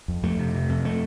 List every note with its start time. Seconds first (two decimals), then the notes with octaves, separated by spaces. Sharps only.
0.08 F2
0.23 F2 A3
0.39 C3
0.54 C3
0.70 F2
0.85 A3